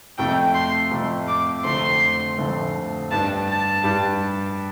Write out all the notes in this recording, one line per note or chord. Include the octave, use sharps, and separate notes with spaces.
F2 C3 A3 G5
C6
F2 C3 A3
D6
F1 F2 D3 A3 C4 C6
F1 F2 D3 A3 C4
G2 G3 D4 A5
A5
G2 G3 D4